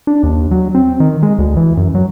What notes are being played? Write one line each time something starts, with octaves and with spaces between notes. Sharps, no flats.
D4
D#2
F#3
C4
D#3
G#3
D2
E3
F#2
F#3